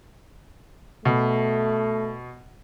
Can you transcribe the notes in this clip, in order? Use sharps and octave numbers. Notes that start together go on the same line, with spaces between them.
B2 A3